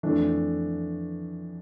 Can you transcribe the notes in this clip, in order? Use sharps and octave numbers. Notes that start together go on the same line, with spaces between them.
F2 E3 A3 D4